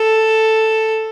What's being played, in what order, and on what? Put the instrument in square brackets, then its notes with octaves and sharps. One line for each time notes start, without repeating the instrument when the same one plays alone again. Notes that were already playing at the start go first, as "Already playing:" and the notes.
Already playing: [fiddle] A4